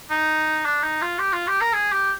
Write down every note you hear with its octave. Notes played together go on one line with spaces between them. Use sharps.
D#4
D4
D#4
F4
G4
F4
G4
A#4
G#4
G4